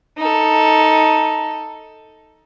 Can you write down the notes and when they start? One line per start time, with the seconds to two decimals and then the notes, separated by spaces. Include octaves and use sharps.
0.18 D#4 A4